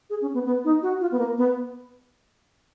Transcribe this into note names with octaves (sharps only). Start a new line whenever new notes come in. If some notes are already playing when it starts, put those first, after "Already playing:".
G#4
C#4
B3
B3
D#4
F#4
F4
B3
A#3
B3